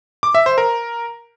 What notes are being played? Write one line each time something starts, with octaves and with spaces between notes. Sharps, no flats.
D6
E5
C5
A#4